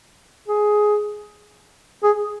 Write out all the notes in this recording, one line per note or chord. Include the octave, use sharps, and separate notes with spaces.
G#4
G#4